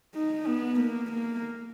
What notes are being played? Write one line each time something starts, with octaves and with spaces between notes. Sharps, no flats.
D#4
B3
A#3
A#3